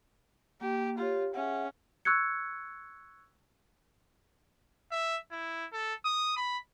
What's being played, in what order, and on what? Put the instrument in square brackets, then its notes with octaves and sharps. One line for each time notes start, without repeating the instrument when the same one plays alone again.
[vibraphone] A#3 [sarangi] G4
[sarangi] F4 [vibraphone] G4 C#5
[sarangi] C#4 [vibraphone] G#4 E5 F#5
[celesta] C#6 E6 F#6 G#6 C#7
[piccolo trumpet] E5
E4
A4
D#6
B5